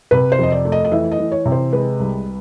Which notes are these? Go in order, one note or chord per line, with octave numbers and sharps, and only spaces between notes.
C3 B4
C5
F2 D#5
D5
A3
D#5
D#5
E3 E5
D#5
E3
C#5
C3
C5
G#3 B4
C2